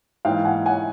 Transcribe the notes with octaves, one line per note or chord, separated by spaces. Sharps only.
G#2 E3 F5 G5
F#5 G#5
F#5 G#5